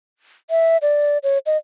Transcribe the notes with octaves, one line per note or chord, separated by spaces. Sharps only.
E5
D5
C#5
D#5